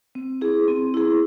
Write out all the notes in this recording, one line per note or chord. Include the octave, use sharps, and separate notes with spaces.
C4
E4 G#4
C4
E4 G#4